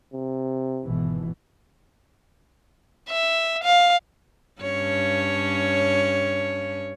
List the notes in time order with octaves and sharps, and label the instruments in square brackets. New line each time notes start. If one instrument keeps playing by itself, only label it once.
[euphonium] C3
[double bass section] G#1 B2 E3
[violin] E5
F5
[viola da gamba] G2 C#4 C#5